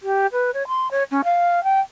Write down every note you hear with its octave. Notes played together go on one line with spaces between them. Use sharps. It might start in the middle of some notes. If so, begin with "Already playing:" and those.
G4
B4
C#5
C6
C#5
C#4
F5
G5